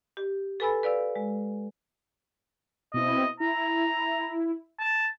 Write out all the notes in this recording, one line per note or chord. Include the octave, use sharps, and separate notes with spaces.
G4
A4 B4 G#5 B5 E6 A6
B4 D5 F5 E6
G#3
B2 C4 E4 D#5
E4 A#5
A5